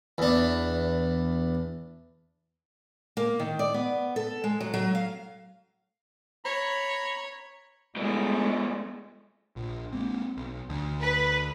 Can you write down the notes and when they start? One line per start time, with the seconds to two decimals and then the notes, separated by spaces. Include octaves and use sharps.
0.18 E2 D4
3.17 A#3
3.40 D#3
3.59 D5
3.74 B3
4.16 A4
4.44 G#3
4.60 F#3
4.74 F#3
4.95 F5
6.45 C#5 A#5 B5
7.96 G2 B2 G#3 A3
9.56 A#1
9.93 G#3 A#3 C4
10.37 B1
10.70 D2
11.01 B4